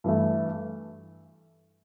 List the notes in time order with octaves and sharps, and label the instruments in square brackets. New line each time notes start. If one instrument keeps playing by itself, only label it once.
[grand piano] G2 E3 A3